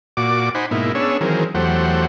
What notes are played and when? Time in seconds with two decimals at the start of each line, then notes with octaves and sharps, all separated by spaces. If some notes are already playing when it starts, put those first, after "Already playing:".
0.17 A#2 F#4 D5 D6
0.55 D#4 C5 F#5 G#5 B5
0.71 G#2 B2 A#3 D#4 E4
0.95 B3 C#4 D4 G#4 C#5 E6
1.21 D#3 E3 F#3 C4 G#4 A#4
1.55 E2 F#3 A3 G4 C5 F#5